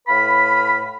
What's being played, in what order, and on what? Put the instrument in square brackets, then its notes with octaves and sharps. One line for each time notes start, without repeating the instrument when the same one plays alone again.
[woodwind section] A2 B4 F5 B5